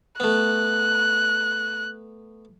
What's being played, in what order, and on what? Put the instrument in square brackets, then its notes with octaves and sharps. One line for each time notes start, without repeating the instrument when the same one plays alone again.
[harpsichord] A3 B3 [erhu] F#6